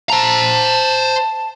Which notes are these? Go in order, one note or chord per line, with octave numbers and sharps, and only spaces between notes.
C5 A5 A#5